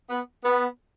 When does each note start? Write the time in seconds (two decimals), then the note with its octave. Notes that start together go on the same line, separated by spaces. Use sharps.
0.08 B3
0.43 B3